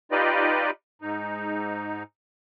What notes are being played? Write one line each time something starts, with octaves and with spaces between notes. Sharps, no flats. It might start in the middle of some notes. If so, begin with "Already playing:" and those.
D#4 F4 G4 B4 D5 D#5
G#2 D#4